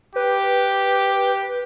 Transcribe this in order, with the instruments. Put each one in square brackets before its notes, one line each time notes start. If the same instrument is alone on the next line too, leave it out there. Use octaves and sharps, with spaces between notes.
[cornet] G4 [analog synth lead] B4